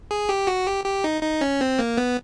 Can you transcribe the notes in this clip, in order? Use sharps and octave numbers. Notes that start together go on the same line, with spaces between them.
G#4
G4
F#4
G4
G4
D#4
D#4
C#4
C4
A#3
B3